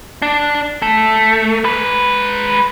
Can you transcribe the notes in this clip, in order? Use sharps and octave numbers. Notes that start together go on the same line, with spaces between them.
D4
A3
G#3 B4